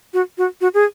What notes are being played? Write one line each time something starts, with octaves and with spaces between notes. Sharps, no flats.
F#4
F#4
F#4
G#4